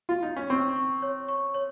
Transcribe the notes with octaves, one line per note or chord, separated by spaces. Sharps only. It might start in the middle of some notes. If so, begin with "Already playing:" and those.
F4
D#4
C#4
C4 C#6
C#6
C#5
C#6
C#5